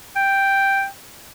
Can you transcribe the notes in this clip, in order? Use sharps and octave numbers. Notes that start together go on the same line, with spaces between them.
G5